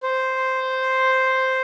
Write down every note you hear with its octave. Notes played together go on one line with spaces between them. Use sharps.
C5